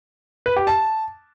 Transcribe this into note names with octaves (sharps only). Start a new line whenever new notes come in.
B4
G4
A5